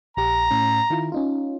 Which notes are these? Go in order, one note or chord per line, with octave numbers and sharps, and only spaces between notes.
A#1 G4 A#5
A2 C#4
D#3 E4 F4
C#4 D#4 F4